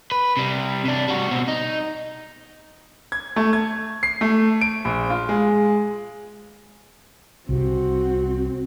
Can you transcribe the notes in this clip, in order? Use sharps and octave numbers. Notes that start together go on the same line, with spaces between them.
B4
C3 G3
C3 D4
G3 F#4
B2 C4
D#4
G#6
A3
G#6
C7
A3
D7
A#1
F4
G#3
C2 C3 C4 F#4